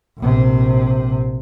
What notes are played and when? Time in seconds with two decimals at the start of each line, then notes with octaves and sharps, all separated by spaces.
0.18 A#1 C3